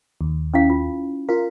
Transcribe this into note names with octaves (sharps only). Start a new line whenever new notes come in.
D#2
C#4 E4 F5
F4
F4 A#4 F5